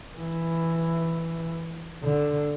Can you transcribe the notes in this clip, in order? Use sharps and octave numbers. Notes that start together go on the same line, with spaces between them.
E3
D3